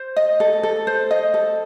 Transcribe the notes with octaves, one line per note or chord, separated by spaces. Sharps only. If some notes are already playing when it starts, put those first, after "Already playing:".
Already playing: C5
D#5
A4
A4
C5
D#5
A4